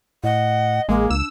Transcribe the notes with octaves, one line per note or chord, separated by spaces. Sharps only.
A2 D#5 F#5
A1 G#3 A#3
C#2 D4 E6